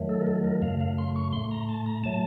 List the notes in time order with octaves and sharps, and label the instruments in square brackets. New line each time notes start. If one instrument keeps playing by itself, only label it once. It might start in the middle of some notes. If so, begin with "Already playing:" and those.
Already playing: [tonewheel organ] F2 D#3 F#3 A3
A4
A#4
A4
A#4
F#2 C#3 A3 F5
F5
C6
C#6
A2 A3 C6
A#5
A5
A#5
A#2 F#3 A3 A5